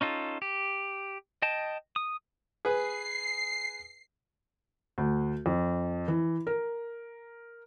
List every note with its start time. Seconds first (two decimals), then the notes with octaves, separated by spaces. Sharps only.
0.01 C#4 D#4 F4 A4
0.42 G4
1.42 D#5 G5 A5
1.96 D#6
2.65 G#4 B4 C7
4.98 D2
5.46 F2
6.08 E3
6.47 A#4